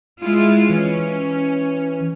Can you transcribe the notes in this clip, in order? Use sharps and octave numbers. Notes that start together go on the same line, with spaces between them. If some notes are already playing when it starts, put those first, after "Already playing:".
G#3 E4 F4
E3 C#4